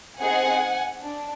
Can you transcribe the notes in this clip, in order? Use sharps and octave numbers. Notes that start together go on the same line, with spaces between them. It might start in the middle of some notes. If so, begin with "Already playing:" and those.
C4 D#4 G#4 F#5 G#5
D4